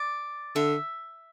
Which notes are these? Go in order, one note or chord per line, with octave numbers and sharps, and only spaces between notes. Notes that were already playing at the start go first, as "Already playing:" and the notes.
Already playing: D5
D3 E5